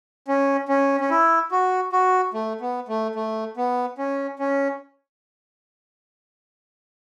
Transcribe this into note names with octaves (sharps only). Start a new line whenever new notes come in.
C#4
C#4
C#4
E4
F#4
F#4
A3
B3
A3
A3
B3
C#4
C#4